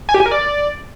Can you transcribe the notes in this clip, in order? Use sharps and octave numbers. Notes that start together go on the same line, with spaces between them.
G#5
G4
G#5
A#4
D5